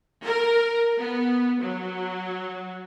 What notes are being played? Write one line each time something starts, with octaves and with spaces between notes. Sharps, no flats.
A#4
B3
F#3